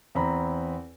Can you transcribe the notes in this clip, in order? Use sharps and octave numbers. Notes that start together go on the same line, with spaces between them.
E2 C4 A#5 B5